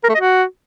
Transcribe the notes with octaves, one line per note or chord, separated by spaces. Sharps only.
A#4
A3
D#5
F#4